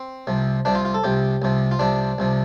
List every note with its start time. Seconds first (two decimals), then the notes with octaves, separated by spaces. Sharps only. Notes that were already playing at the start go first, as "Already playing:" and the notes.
Already playing: C4
0.27 C2 C3 F3
0.65 C2 C3 F3 D4
0.75 F4
0.85 F4
0.94 A4
1.04 C2 C3 F3 G4
1.42 C2 C3 F3
1.71 F4
1.79 C2 C3 F3 D4
2.18 C2 C3 F3